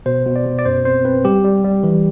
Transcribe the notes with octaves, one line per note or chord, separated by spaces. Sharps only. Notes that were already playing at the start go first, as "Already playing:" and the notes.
B2 C5
B2
D5
B2
D5
F#2 C5
C4 C5
C4 B4
G3 G4
G3
G3
E3